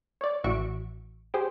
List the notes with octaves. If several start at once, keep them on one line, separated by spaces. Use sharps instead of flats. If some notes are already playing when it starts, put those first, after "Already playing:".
C#5 D5
A1 E3 F#4 E5 C#6 D7
G4 G#4 C5